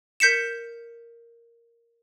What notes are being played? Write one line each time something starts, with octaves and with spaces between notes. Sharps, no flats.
A#4 G6 B6 C#7 E7